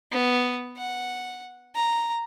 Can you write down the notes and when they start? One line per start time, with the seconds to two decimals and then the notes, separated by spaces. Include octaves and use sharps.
0.12 B3
0.77 F#5
1.75 A#5